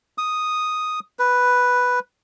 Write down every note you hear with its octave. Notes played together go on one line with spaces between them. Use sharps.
D#6
B4